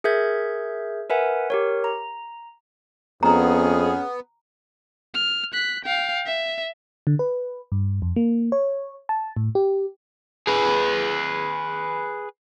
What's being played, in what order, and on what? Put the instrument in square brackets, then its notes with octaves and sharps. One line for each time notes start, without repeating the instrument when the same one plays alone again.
[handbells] G#4 A#4 E5 G6 G#6
A#4 B4 E5 F#5 G#5
G4 A#4 C#5
A#5
[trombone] F2 [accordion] B3 [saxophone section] C#4 G#4 [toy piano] A#5
[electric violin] F6
F#6 B6
F5 G5
E5
[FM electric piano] D3
B4
G2
F2
A#3
C#5
A5
A2
G4
[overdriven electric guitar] G#4 B4